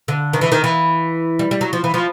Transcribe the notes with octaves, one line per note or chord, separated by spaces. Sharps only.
D3
D#3
E3
D#3
E3
G3
G3
F#3
F3
E3
F3